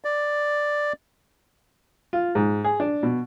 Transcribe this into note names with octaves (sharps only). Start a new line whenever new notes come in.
D5
F4
G#2
G#4
D4
B2